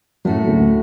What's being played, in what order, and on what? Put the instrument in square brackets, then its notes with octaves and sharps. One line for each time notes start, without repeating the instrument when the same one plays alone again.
[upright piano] F#2 F#3 [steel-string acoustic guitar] A2 A3 F#4
[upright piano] D2 D3